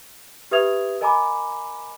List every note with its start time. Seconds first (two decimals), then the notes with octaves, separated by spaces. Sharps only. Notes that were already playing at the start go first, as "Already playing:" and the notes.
0.51 G4 B4 E5 D#6 G#6 F7
1.01 A#4 D#5 G#5 A#5 B5 D6